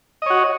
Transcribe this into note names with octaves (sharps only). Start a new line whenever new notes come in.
F#4 C#5 D#5